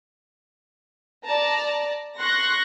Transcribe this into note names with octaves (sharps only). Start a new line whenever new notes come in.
D5 A5 A#5
C6 C#6 F#6 A#6